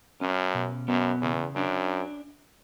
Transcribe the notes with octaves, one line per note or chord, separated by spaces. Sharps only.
F#2 C#4
B2
F#2 B3
E2 C#3
F#2 D4